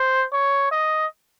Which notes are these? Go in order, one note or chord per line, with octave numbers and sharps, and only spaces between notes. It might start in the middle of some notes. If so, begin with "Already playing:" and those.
Already playing: C5
C#5
D#5